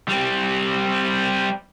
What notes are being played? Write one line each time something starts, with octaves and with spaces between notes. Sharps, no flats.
G3 C4